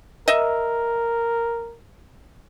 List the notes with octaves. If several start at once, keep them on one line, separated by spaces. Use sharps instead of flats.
A#4 D#5 E5